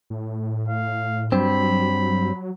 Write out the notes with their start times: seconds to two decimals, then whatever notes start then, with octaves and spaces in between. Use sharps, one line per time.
0.10 A2
0.68 F5
1.32 G2 F#3 C4 B5